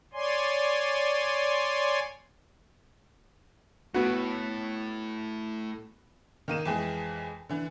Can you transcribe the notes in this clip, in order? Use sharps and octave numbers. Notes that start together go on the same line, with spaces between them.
C#5 D5 G#5 C6
A2 B3 F#4
D#3 A#3 D#7 E7
F2 E3 G#3 G#4
D3 E3